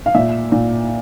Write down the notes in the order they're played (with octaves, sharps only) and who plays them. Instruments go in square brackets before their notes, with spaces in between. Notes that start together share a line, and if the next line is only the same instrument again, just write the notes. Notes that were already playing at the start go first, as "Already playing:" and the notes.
[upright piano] F5
A#2 E5
A#2